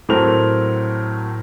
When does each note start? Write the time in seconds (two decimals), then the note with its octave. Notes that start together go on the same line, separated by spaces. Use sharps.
0.09 A2 F#3 A3 C4 A#4 F7